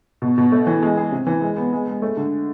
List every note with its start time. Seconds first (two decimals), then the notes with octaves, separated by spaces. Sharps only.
0.22 B2
0.38 B2
0.52 A3
0.67 E3
0.83 G#3
0.97 G#4
1.12 C3
1.27 E3
1.41 G#3
1.57 B3
1.73 G#3
1.87 G#3
2.02 A3
2.17 D3